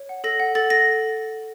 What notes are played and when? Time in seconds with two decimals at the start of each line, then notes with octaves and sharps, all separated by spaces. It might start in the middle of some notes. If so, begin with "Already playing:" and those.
Already playing: C#5
0.09 F#5
0.24 A4 A#6
0.40 F#5
0.55 A4 A6
0.70 A4 A#6